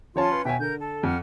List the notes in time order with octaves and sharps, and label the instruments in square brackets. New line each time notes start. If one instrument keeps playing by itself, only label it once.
[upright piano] F3 C#5 A5 [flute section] C#4 F4 C6
[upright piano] B4
[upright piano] B2 G#5 [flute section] C#5 E5 G5
[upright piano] D3 [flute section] A#4 G6
[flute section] A4
[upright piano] F2 [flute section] F#5 F6